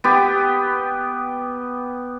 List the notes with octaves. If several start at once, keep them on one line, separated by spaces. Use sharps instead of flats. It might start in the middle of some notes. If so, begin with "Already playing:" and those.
B3 G4